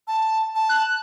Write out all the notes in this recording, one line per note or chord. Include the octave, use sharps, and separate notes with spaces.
A5
A5
F#6